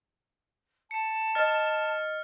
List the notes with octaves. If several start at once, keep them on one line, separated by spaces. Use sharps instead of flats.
A5 C#7
D#5 F6 A6